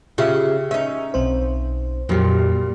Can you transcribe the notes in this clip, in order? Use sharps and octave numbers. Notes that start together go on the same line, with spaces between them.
C#3 F4 G4 E5
C#4 D#4 E5
B1 C4 C5
F2 A#2 F#3 G3